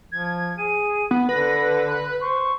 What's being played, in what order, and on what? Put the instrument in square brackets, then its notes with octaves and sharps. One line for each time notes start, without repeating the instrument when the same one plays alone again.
[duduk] F3 [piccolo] G#6
[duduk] G#4 [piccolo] D#7
[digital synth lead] B3
[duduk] D3 [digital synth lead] B4 [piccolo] A#6
[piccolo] F#6
[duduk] C5 [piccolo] C#6